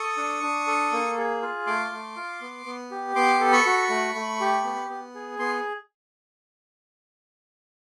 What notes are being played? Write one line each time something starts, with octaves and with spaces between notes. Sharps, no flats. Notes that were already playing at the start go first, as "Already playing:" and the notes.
Already playing: A4 C#6 D#6
D4
D4
A4
A#3
G#4
F4
A3 C6 D6
A3
F4
B3
B3
G4
B3 C6 D6
A4
B5 C#6
F#4
A3
A3
G4
B3
B3
G#4
B3 C6